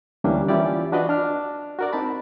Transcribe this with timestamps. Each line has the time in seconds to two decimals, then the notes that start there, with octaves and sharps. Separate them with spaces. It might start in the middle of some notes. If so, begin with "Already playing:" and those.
0.24 D2 E3 G3 A#3 C#4 D4
0.48 E3 C#4 E4 F4 G4 D5
0.92 D4 F4 F#4 B4 D5 D#5
1.09 D4 F6
1.79 F#4 A#4 D5
1.93 C4 D#4 A5 B5